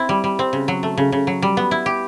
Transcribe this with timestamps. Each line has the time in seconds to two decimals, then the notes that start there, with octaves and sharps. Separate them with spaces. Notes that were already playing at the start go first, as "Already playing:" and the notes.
Already playing: C4 E4
0.09 G3
0.24 G3
0.39 C4
0.53 C#3
0.68 F#3
0.83 A3
0.97 C#3
1.12 C#3
1.27 F#3
1.42 G3
1.57 B3
1.71 E4
1.86 G4